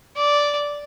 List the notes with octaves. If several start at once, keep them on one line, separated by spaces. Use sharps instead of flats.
D5